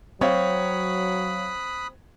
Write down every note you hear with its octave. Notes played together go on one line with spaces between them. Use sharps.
F#3 C4 C#5 F5 B5 D#6 F#6